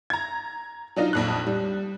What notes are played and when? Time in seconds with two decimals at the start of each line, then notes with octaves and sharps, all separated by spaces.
0.10 A#5 G#6
0.96 F#3 D4 D#4 F4
1.13 A#1 F2 F#6
1.47 G3